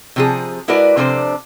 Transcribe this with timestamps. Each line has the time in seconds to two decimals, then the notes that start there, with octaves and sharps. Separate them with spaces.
0.16 C3 F3 G#4
0.68 G#3 E4 F#4 A#4 B4 D5
0.97 C3 F3 D4 A4 C5